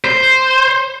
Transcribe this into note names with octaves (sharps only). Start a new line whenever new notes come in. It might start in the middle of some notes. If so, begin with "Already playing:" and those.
C5